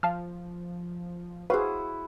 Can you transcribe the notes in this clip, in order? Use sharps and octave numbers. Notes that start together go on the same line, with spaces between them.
F3 F5 A5 F6
E4 F#4 G#4 B4 C5 F5